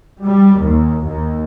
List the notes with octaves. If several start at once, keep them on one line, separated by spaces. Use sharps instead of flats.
G3
D#2
D#2